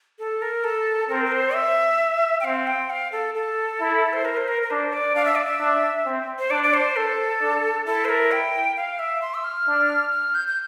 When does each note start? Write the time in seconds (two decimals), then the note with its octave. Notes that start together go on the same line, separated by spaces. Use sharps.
0.19 A4
0.42 A#4
0.64 A4
1.09 C4 A#4
1.25 A#4
1.32 C5
1.54 E5
2.40 G5
2.44 C4 F5
2.67 G5
2.90 F5
3.12 A4
3.35 A4
3.81 E4
4.13 C5
4.25 A#4
4.37 C5
4.48 A#4
4.63 A#4
4.70 D4 C5
4.93 D5
5.15 D4 F5
5.25 E5
5.35 D5
5.45 E5
5.60 D4
6.06 C4
6.39 C5
6.50 D4 D5
6.63 D5
6.74 C5
6.96 A4
7.41 D4
7.86 E4 A4
8.05 C5
8.09 A#4
8.32 G5
8.77 F5
8.99 E5
9.22 C6
9.34 E6
9.44 F6
9.67 D4
10.12 F6
10.35 G6
10.48 G6